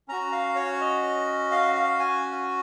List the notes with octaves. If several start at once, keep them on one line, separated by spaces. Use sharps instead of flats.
C#4 F#4 A#5
F5
C#5
D#5
F5
F5
G#5